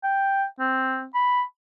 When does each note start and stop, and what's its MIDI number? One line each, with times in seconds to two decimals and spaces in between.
0.03 0.45 79
0.59 1.05 60
1.14 1.42 83